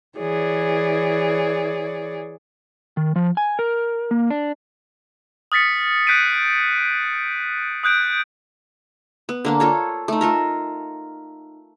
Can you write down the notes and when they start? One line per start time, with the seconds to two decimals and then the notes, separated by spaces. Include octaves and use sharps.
0.18 E3 G#4 C#5 D5
2.97 D#3
3.16 F3
3.37 G#5
3.59 A#4
4.11 A#3
4.31 D4
5.52 D#6 F6 A6 B6 C#7
6.07 F#6 G6 B6 C7 D7 D#7
7.84 D#6 F#6 G6 D7
9.29 B3
9.45 D3 A#3 D4
9.60 F4 A4 C#5
10.08 A3 D#4
10.21 F4 A4 A#4